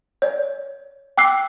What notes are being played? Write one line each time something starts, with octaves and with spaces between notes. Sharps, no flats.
C#5 D5
G5 D6 E6 F#6 C7